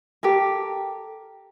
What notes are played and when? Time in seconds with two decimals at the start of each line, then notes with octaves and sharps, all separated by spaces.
0.23 G4 A4 A#4